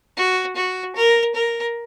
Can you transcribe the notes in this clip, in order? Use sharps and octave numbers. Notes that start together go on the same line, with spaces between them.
F#4
F#4
A#4
A#4